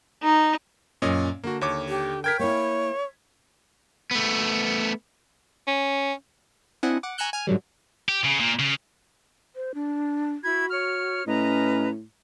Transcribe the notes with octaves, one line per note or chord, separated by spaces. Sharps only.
D#4
F#2 A#2 C#4 C#5 D#5
D3 A#3 F#4
D#2 C#5 D6
G4
A#4 G5 G#6 B6
A#3 E4 C#5
A3 B3
C#4
C4 D4 E4 D#5 F#5 G#5
F#5 D6
G#5 A#5 C#6 E6 F#6 G6
G#5 F6
G#2 D3 F#3 G3
G4
C#3
A#2
C#3
C5
D4
E4 F#4 B5 G#6
C#5 F6
A2 C#4 B4 D#5 A#5